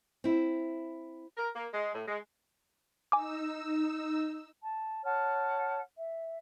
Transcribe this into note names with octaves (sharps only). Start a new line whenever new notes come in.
C4 E4
A#4
A#3
G#3
A2
G#3
D#4 G#5 D6 E6
A5
C#5 F#5 A5 F6
E5